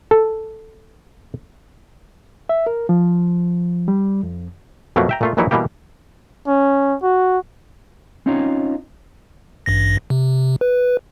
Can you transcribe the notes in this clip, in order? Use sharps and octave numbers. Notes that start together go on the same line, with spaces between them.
A4
E5
A#4
F3
G3
F2
F2 B2 F#3 A3 A#3
E5 G5 A#5
A#2 A3 F4
A#1 A#2 E3 F#3 D#4 E4
B2 E3 G3 A#3 G4
C#4
F#4
C4 C#4 D#4 F4 C#5 A#5
A1 G2 A#6
C3
B4